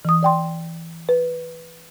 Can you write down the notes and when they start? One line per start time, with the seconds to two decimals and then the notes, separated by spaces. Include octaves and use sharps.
0.05 E3 D#6
0.23 D5 G5 C6
1.09 B4